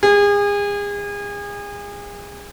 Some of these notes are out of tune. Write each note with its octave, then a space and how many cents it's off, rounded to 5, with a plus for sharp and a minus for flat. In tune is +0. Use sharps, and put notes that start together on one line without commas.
G#4 -35